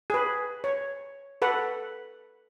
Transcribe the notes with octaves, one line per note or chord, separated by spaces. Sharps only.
G#4 B4
C#5
A4 B4 F#5